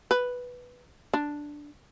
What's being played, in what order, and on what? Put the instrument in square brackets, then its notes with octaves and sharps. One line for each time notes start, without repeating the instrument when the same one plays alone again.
[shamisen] B4
D4